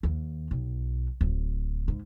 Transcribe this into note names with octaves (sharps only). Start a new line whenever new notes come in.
D#2
B1
D1
G#2